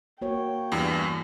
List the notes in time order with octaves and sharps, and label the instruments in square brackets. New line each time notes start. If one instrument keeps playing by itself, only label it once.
[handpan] A#3 F#4 C#5 [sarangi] G5
[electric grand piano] E2 G2 E3